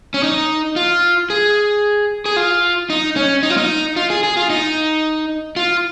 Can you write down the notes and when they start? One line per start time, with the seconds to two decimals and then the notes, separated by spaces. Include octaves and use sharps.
0.14 C#4
0.23 D#4
0.76 F4
1.30 G#4
2.26 G#4
2.36 F4
2.90 D#4
3.16 C#4
3.43 D#4
3.50 F4
3.57 D#4
3.96 F4
4.10 G#4
4.23 G#4
4.37 F4
4.50 D#4
5.56 F4